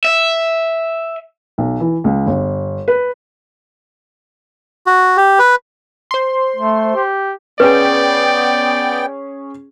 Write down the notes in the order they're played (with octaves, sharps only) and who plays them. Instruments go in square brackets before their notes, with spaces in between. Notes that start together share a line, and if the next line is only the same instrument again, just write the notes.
[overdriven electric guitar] E5
[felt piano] B1
E3
C#2
G1
B4
[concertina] F#4
G4
B4
[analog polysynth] C5 C6
[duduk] A3
G4
[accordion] B3 G5 [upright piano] C#4 G#4 [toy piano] B4 [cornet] D5